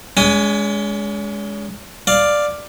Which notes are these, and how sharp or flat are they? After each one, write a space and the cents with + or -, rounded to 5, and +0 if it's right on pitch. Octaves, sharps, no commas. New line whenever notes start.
G#3 +0 C#4 +40 G#5 +0
D5 +5 F5 +0